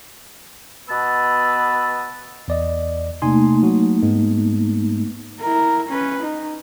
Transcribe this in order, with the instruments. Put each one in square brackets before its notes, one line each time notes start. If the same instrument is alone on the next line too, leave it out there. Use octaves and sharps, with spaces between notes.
[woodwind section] B2 B3 B4 A5 E6
[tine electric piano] E2 D5 D#5
[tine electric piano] C3 G#5 C6 [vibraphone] A3 A#3 D#4
[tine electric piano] F#3 F#4
G#2 G#3 B3
[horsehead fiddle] E4 A#4
C#4 B4
D#4